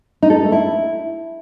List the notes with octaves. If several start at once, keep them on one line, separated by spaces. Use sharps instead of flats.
D#4
A4
D#4
A3
E4